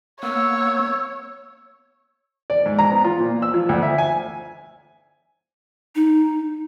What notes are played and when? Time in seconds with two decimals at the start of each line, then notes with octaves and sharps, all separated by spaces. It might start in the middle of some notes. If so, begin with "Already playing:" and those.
0.23 A#3 B3 C#5 E6
2.50 D5
2.66 G#2
2.79 A#5
2.92 B3
3.04 F4
3.20 A#2
3.42 E6
3.54 F3
3.69 D2
3.83 E5
3.98 G#5
5.95 D#4